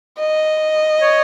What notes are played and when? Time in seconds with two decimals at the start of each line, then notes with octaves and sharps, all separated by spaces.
0.20 D#5
1.01 C#5